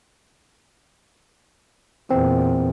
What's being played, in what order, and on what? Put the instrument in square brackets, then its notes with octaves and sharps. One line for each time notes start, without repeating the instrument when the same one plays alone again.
[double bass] E2 A#2 [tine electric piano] C4